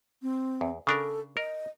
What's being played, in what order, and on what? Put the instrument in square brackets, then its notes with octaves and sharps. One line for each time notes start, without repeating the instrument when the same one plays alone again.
[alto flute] C4
[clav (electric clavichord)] E2
[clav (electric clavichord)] C#3 D4 A#4 [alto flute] A4
[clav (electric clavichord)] A#4 [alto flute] D#5